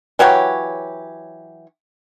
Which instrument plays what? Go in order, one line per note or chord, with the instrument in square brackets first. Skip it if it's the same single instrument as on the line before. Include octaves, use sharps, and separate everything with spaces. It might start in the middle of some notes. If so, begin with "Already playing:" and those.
[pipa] E3 F#3 G4 C#5